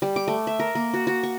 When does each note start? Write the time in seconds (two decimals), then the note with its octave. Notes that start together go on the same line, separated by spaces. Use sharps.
0.02 G3
0.16 D6
0.28 A3
0.47 E5
0.60 A#4
0.75 A#3
0.94 F#4
1.07 F#4
1.23 C#6